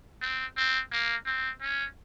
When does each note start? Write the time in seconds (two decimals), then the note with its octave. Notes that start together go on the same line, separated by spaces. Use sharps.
0.22 C4
0.57 C4
0.92 A#3
1.26 C4
1.61 C#4